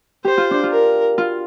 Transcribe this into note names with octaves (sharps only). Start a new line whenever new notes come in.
G4 C5
F4
D4
F4
A#4
F4